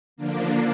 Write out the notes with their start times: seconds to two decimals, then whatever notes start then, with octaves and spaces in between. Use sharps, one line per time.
0.16 D3 F3 A#3 D4